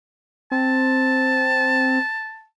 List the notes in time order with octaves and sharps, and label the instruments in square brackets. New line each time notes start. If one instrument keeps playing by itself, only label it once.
[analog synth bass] C4 [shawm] A5